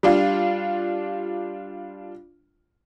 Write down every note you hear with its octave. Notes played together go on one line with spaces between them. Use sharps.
G3 D4 F4